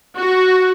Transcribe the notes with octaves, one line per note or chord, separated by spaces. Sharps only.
F#4